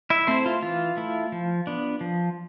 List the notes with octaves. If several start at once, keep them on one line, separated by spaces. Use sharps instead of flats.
E4 E5
A3 C4 E4 C5
F4
E3 F4
A3 E4
F3
B3 D4
F3